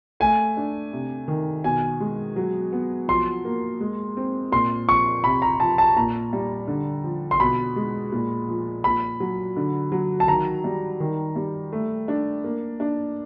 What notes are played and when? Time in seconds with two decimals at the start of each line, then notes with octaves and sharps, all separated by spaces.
0.20 A3 G#5
0.57 D4
0.93 C3
1.28 D#3
1.64 B2 G#5
2.00 G#3
2.36 F#3
2.72 B3
3.08 F3 C6
3.45 A#3
3.80 G#3
4.17 C4
4.52 A#2 C6
4.88 F3 C#6
5.24 C3 B5
5.42 A#5
5.60 F3 A5
5.78 A5
5.96 A#2 A#5
6.33 G3
6.68 D3
7.04 F3
7.31 C6
7.40 B2 B5
7.76 G#3
8.12 A#2
8.48 F3
8.84 A#2 B5
9.20 F#3
9.57 D3
9.92 F#3
10.20 A5
10.28 D#3 A#5
10.64 G3
11.00 D#3
11.36 G3
11.73 A3
12.08 D4
12.44 A#3
12.80 D4